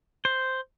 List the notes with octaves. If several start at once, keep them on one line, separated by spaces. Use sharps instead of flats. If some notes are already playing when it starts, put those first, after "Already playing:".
C5